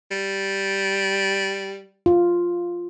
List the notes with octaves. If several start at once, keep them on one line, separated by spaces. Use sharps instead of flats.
G3
F4